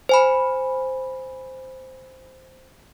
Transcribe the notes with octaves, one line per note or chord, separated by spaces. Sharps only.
C5 G#5 B5